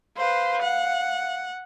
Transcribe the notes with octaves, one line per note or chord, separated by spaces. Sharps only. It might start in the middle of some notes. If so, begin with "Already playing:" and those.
B4 C5 F5
F#5